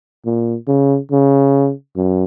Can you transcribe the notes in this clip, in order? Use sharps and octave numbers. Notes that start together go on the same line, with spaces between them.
A#2
C#3
C#3
F#2